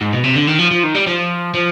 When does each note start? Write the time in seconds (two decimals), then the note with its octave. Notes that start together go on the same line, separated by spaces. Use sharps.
0.01 G#2
0.13 B2
0.24 C3
0.35 D3
0.47 D#3
0.59 F3
0.71 F3
0.83 D#3
0.94 G3
1.07 F3
1.54 F3